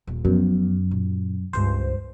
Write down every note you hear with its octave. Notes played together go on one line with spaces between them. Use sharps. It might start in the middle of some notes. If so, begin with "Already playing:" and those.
D#1
F#2 F3 B3
A#2
C#2 G2 C5